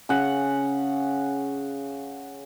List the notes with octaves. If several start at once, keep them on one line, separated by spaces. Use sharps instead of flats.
C#3 F#5